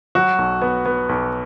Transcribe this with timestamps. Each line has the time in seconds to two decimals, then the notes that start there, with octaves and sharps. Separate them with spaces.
0.15 F#3 F#4
0.38 B1
0.61 B3
0.86 B3
1.09 B1